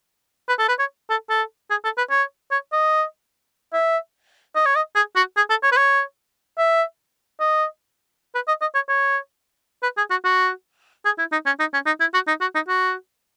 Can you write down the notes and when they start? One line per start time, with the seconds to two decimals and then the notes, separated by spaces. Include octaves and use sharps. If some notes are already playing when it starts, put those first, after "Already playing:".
0.49 B4
0.59 A4
0.69 B4
0.79 C#5
1.10 A4
1.30 A4
1.70 G#4
1.84 A4
1.98 B4
2.10 C#5
2.51 C#5
2.72 D#5
3.73 E5
4.55 D#5
4.66 C#5
4.75 D#5
4.95 G#4
5.16 F#4
5.37 G#4
5.50 A4
5.63 C#5
5.72 B4
5.77 C#5
6.58 E5
7.40 D#5
8.35 B4
8.48 D#5
8.61 D#5
8.74 C#5
8.89 C#5
9.83 B4
9.97 G#4
10.11 F#4
10.25 F#4
11.05 G#4
11.19 E4
11.32 D#4
11.46 C#4
11.60 D#4
11.74 C#4
11.86 D#4
12.00 E4
12.14 F#4
12.28 D#4
12.41 F#4
12.55 D#4
12.68 F#4